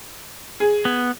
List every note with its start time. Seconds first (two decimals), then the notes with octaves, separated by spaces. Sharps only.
0.60 G#4
0.85 B3